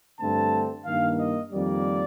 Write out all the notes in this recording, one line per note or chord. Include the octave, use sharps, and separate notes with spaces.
G2 D3 A3 C4 A5
G2 D#3 A#3 F5
D#5
F2 D#3 G3 A#3 D5